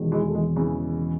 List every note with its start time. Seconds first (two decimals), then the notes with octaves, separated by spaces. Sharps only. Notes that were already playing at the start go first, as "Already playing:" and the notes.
Already playing: E1 E2 D#3
0.12 E3 G#3
0.29 A3
0.35 E3 G#3
0.56 C#3 E3